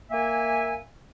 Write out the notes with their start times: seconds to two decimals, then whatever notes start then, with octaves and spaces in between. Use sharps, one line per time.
0.11 A#3 E5 G#5